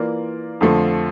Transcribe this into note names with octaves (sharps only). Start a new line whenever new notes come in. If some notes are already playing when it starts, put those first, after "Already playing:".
Already playing: E3 A#3 F4 A#4 D5
F2 D3 F3 A3